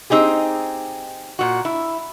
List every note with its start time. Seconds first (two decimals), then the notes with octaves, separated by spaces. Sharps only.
0.10 C4 D#4 G4 G#4
1.39 A#2 F#4
1.65 E4